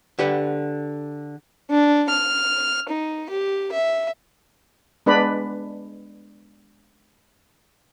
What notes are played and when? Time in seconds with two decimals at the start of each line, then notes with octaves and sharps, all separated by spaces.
0.19 D3 G4 B4 F#5
1.70 D4
2.09 F6
2.89 D#4
3.30 G4
3.72 E5
5.06 G#3 B3 D4 B4 D5 B5